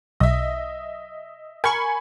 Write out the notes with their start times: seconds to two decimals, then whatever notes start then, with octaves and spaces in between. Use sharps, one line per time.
0.20 B1 D#5 E5
1.64 A#4 G#5 B5 C#6